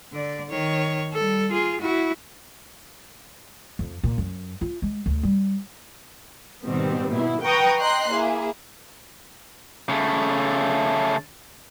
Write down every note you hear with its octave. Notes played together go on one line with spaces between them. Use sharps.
D3 D5
D#3 C#5
G3 A4
F4 G#4
E4 F#4
F2
A#2
F#2
F4
G#3
D2
G3
G#2 B2 D#3 G3 B3 C4
B2 B3 E4
B4 F#5 G5 A#5 C#6 D#6
D#5 G5 A#5 C6 F#6 C7
A#3 E4 G#4
C#3 A3